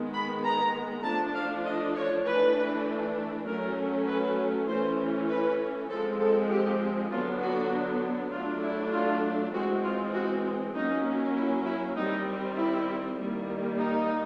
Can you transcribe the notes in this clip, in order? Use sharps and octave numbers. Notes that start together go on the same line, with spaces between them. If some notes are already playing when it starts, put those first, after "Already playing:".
Already playing: D#3 G#3 B3
B5
A#5
F3 A3 D4 A5
F5
D#5
C#5
E3 A3 D4 B4
F#3 A3 C#4 A#4
B4
E3 A3 C#4 C5
B4
F3 G#3 C4 A4
A4
G4
D3 F#3 B3 D4 F4
F#4
F#3 A3 D4 F4
E4
F4
E3 G#3 C4 F#4
F4
F#4
F#3 A#3 C#4 D#4
E4
E4
D#3 G3 C4 D#4
E4
D#3 G3 A#3
D#4